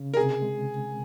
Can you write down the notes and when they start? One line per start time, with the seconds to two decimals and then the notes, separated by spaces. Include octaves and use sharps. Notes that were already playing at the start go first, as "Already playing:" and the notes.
Already playing: C#3
0.14 A#4
0.17 C3 G#4
0.42 G#3